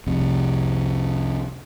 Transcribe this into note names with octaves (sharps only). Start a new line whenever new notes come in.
C2 F2 C3